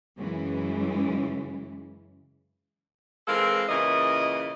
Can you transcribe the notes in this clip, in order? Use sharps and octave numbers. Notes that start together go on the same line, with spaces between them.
F#2 C#3 E3 G#3
E3 G#3 C4 A4 A#4 F5
A#2 C#3 E3 A#4 D#5